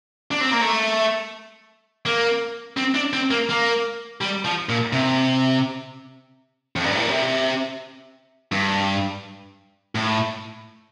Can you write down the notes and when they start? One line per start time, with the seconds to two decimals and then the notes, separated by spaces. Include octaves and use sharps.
0.31 D4
0.41 C4
0.52 A#3
0.62 A3
2.06 A#3
2.77 C4
2.95 D4
3.13 C4
3.31 A#3
3.49 A#3
4.21 G3
4.45 F3
4.69 A#2
4.93 C3
6.76 F2
6.84 G2
6.92 A2
7.00 A#2
7.09 C3
8.52 G2
9.95 A2